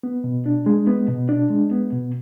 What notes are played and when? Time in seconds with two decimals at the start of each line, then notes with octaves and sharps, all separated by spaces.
0.03 B3
0.24 B2
0.46 D4
0.66 G#3
0.87 B3
1.08 B2
1.29 D4
1.50 G#3
1.71 B3
1.92 B2